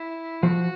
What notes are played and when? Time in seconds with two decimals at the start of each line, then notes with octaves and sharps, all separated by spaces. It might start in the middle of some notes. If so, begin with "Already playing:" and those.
Already playing: E4
0.43 F3 F#4